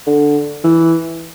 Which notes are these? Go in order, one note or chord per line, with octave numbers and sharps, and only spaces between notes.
D3
E3